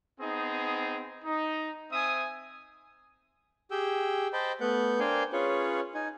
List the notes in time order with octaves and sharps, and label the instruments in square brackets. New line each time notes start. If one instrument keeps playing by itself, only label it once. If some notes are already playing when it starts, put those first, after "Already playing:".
[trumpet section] B3 C4 D#4 G#4
D#4
C4 E5 G#5 D#6
[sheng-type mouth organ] G4 G#4 G5 E6
C5 D#5 G5 A5 B5
A3 B3 B4 F#5 G6
D4 A#4 C5 F5 G5 G#5
C#4 F4 G#4 B4 C#5
D#4 G#5